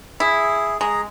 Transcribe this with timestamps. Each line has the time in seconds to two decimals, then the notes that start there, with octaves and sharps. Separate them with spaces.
0.20 E4 G#4
0.81 G#3 G#4 A#5